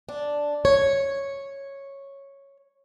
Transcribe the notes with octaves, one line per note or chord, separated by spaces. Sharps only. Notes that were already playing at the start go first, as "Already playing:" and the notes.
D4
C#5